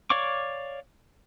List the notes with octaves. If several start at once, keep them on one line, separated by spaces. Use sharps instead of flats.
C#5 D5 F5 C#6 D6